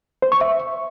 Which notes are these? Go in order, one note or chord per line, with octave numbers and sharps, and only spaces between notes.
C5
C#6
E5